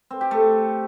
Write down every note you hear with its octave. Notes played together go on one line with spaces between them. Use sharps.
C4
G4
A3